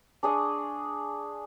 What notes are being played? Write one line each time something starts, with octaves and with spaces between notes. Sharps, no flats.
D4 G#4 D#5 C#6